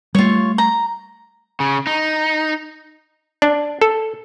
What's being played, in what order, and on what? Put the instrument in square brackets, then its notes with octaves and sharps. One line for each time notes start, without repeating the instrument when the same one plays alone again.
[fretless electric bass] G3 A3 [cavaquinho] F4 C#5
[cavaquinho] A#5
[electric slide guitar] C#3
D#4
[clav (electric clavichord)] D4
A4